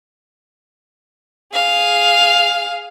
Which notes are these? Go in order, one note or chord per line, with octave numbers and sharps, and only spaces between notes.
G#4 F5